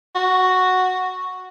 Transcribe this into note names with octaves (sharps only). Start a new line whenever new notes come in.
F#4